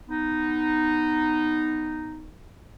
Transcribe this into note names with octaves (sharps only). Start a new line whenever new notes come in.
B3 D#4